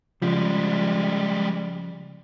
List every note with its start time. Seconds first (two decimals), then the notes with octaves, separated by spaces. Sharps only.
0.22 C#3 F3 G3 G#3